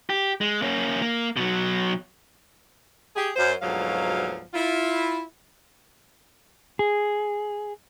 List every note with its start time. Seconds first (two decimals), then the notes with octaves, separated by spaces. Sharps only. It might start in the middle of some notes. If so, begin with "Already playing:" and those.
0.10 G4
0.41 G#3
0.62 A#3 C#4
1.02 A#3
1.36 B2 F#3
3.16 G4 G#4
3.36 F#2 C5
3.62 D2 G#2 B2 F3 F#3 F5
4.54 E4 F4
6.79 G#4